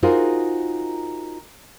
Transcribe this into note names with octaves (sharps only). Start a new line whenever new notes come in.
D#4 F4 F#4 G#4 A#4 C5